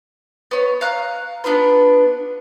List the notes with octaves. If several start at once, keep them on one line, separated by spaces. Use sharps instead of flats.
B3 C#5
F5 A#5 F#6
B3 D4 F4 B4